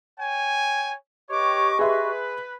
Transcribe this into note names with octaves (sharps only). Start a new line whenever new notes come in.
C#5 G5 G#5
G4 B4 C#5 D#5 C#6 D6
G#4 B4 E5 C6